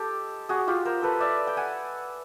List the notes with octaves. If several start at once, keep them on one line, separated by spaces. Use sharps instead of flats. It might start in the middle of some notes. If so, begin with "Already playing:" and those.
Already playing: G#3 G4 A4
F#4 G#4
F4 G4
A#4 C5
A4 B4
D5 E5
G5
F#5 G#5